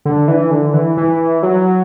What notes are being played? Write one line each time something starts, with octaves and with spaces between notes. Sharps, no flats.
D3
E3
D3
E3
E3
F#3